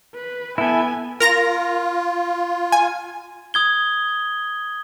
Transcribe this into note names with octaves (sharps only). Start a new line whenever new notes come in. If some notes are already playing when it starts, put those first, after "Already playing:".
B4
B3 E4 A4 G#5
F4 A#4 A#5 A#6
G#5
D#6 G#6 G7